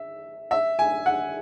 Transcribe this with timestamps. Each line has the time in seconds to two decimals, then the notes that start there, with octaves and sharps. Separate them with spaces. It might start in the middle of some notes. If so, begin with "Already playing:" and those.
Already playing: E5
0.51 E5
0.79 G#5
1.06 F#5